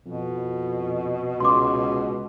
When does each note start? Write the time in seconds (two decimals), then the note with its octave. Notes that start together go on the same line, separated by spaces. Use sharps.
0.06 F2 B2
1.40 C#2 C6 D6